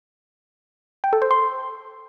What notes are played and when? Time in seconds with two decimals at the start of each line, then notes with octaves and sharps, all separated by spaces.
1.04 G5
1.13 A4
1.22 C5
1.31 C6